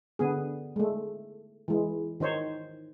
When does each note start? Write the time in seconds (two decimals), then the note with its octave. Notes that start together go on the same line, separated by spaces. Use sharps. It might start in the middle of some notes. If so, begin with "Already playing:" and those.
0.19 D3 B3 G#4
0.76 G#3 A3
1.68 E3 G#3
2.20 D#3 D#4 C5 C#5